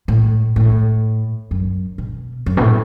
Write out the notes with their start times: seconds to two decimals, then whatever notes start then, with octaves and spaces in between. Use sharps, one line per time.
0.08 A2
0.56 A2
1.51 F#2
1.98 B2
2.46 F#2
2.57 B2
2.61 A2